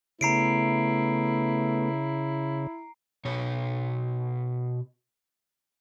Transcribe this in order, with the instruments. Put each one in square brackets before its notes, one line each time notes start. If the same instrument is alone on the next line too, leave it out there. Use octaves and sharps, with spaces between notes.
[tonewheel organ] C#3 [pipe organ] A3 B3 [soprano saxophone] E4 [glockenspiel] A#5 C7 D7
[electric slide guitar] B2 C#5